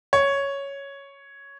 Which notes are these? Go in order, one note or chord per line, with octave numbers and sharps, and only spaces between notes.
C#5